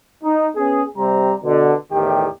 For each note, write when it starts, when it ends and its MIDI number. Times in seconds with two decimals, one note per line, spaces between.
0.23 0.46 63
0.55 0.82 59
0.55 0.82 61
0.55 0.82 68
0.96 1.32 48
0.96 1.32 55
0.96 1.32 60
0.96 1.32 67
0.96 1.32 82
1.44 1.72 47
1.44 1.72 50
1.91 2.26 40
1.91 2.26 45
1.91 2.26 51
1.91 2.26 67